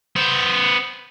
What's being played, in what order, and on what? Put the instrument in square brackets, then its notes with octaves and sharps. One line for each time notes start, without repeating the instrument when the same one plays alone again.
[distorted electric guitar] B3 C5